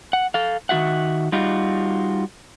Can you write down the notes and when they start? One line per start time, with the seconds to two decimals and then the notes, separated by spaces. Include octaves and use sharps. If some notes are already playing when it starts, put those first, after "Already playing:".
0.13 F#5
0.34 A4 F5
0.69 D#3 G3 F#4 E5 F#5
1.32 G3 D#4 F4 F#4